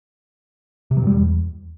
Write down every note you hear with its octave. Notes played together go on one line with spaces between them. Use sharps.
C3
F#3
G2
G3
E2